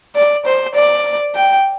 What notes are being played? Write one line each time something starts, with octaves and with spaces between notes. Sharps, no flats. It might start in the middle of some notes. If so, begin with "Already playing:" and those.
D5
C5
D5
G5